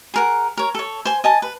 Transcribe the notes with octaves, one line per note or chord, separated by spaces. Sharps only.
G#4 A#4 F#5
A#4 C#5
A4 C#5
C5 G#5
D#5 G#5 A5
B4